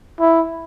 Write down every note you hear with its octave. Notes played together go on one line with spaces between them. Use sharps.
E4